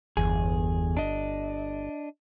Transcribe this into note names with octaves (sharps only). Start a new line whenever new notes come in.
G1 E2 G#4
D4 D#5